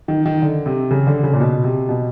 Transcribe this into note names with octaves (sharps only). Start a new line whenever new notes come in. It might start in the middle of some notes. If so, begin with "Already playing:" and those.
D#3
D#3
D3
C3
C#3
D3
C#3
A#2
B2
C3
B2